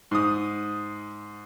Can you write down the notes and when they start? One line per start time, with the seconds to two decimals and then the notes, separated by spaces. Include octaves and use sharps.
0.11 G#2 D#6